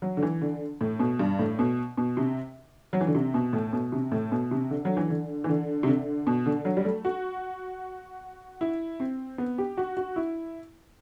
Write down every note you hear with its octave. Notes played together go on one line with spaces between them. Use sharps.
F#3
D3
E3
D3
A2
B2
G2
A2
B2
B2
C3
F#3
E3
D3
C3
B2
A2
B2
C3
A2
B2
C3
D3
F#3
E3
D3
E3
D3
C3
D3
B2
D3
F#3
G3
A3
F#4
E4
C4
B3
G4
F#4
F#4
E4